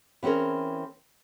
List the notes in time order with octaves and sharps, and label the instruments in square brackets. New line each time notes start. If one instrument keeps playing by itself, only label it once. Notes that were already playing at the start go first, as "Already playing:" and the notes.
[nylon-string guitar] E3 C4 C#4 G#4 A#4